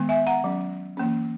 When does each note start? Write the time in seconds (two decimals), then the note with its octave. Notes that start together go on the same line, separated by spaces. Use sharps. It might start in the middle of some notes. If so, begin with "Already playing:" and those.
Already playing: D#3 G#3 B3
0.09 E5 G#5
0.27 F#5 A#5
0.44 F#3 C#4
0.97 E3 A#3 C#4